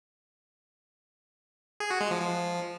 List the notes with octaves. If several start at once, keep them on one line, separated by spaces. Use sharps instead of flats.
G#4
F#4
G#3
F3
F3